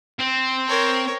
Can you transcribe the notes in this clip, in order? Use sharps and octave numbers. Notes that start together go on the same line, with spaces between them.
C4
A#4 C#5